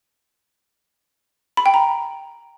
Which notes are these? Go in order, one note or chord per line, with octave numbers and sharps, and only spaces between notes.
B5
G5
A#5